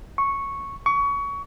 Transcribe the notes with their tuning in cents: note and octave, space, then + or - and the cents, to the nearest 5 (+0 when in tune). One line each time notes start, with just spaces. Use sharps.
C#6 -5
C#6 +25